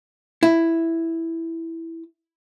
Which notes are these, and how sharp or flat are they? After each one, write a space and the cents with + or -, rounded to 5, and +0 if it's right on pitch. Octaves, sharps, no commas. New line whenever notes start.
E4 +0